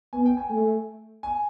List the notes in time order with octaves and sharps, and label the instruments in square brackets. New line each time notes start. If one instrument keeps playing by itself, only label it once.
[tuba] B3 [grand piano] G#5
[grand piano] G5
G#5
[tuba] A3
[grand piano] G#5